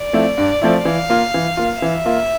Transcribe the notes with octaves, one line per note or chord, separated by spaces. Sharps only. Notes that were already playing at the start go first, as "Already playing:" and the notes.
Already playing: D5
F3 A3 C4 E4
G2
F3 A3 C4 E4
E3 F5
A#3 F4
E3
A#3 F4
E3 E5
A#3 F4